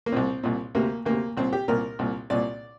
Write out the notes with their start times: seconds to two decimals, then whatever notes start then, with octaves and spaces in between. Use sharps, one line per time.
0.06 A#3
0.12 C2 A#2 C4
0.43 C2 A#2
0.75 D2 C3 A#3
1.05 D2 C3 A#3
1.37 C2 A#2 C4
1.53 G4
1.68 C2 A#2 A#4
1.99 C2 A#2
2.30 C2 A#2 D5